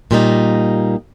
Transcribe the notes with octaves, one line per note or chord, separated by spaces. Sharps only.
A#2 G3 A#3 D#4